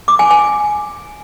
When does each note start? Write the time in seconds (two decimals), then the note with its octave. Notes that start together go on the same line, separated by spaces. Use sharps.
0.08 D6
0.19 G#5
0.31 G#5